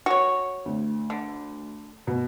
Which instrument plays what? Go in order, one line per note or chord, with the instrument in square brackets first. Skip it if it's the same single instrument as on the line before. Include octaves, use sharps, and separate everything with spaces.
[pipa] F#4 C#5
[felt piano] D2
[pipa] D3
[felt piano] B2